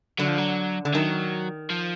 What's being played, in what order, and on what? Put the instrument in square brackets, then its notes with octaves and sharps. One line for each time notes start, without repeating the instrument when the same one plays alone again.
[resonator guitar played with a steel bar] D3 [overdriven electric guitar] F#3
[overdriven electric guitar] F3
F#3
[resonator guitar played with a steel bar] D3
[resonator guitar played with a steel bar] D#3 [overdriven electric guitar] F#3
[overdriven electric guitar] F3